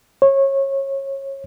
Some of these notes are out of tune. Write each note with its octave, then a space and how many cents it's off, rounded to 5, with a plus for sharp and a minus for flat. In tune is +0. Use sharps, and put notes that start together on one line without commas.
C#5 -25